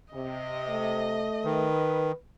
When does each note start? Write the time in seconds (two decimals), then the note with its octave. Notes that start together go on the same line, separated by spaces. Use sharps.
0.14 C3 D#5
0.69 A3
1.44 D#3 B4